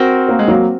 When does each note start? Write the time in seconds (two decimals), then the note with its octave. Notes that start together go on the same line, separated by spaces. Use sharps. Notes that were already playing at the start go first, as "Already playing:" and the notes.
Already playing: C4 F#4 A#4
0.29 A#3
0.39 G#3
0.48 F#3 A#3